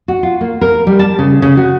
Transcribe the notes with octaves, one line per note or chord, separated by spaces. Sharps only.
F#4
F4
A#3
A#4
G3
A5
C#3
C#3
F#4